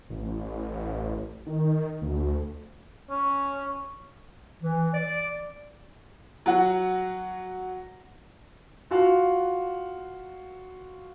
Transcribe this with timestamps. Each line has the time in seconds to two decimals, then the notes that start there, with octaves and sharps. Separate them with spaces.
0.10 A1
1.47 D#3
2.02 D2
3.10 C#4
4.62 E3
4.94 D5
6.46 F#3 F#4
8.91 F4 F#4 F5